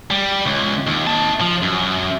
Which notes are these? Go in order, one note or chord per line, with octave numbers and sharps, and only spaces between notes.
G3
C#2
D#2
D#4 A5
F3
F#2